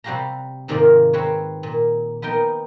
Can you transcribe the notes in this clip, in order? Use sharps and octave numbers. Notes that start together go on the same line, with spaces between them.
C3 G3 F#4 G4 F5 A#5
G#2 C3 D#3 A#3 F4 D5
C4 A#4 B4 C#5
A#2
B3 D#4 A#4 G5